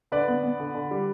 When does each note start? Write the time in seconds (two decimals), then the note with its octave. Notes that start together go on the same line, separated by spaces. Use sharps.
0.12 D3 B4 D5
0.28 B3
0.43 B3
0.60 D3
0.75 D3
0.91 G3